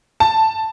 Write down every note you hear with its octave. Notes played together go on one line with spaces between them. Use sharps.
A5